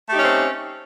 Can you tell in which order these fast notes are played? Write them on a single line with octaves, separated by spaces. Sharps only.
A3 G4 D#4 C#4 C4